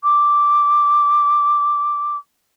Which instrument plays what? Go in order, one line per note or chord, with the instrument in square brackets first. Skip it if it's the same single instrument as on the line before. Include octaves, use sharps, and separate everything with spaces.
[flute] D6